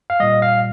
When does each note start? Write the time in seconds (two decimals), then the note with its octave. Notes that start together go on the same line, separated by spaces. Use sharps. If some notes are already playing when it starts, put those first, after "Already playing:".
0.10 F5
0.20 A#2 G3 D#5
0.42 F5